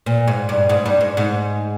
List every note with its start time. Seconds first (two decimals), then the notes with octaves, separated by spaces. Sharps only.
0.06 A#2
0.28 G#2
0.49 G2
0.69 G#2
0.86 G2
1.01 G#2
1.17 G#2